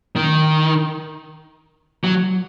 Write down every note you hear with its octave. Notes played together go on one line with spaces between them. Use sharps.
D#3
F#3